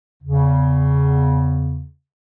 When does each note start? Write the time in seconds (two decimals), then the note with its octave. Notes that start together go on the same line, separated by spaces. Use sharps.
0.23 E2 C#3